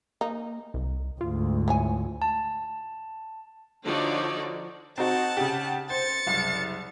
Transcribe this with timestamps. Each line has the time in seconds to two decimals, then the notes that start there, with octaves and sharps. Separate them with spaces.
0.21 A#3 D#4
0.74 C2
1.21 D2 G#2 F4
1.68 E3 C#5 G#5
2.22 A5
3.85 D3 F3 D#4 F#4 C#5 D5
4.98 C4 D#4 F#4 F#5 A5
5.37 C#3 G4
5.90 C5 A6 C#7
6.26 F#1 C2